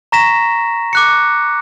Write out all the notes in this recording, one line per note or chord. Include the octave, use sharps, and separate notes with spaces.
A#5 C#6 A#6 B6 E7
D6 F#6 C#7